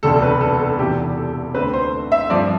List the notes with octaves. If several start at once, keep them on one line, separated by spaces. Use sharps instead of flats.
E1 D2 C3 A4
B4
A4
A4
E1 E2 C3 E3 G4
A4
D2 D3 A3 C4 B4
C5
E5
G2 F3 C4 D5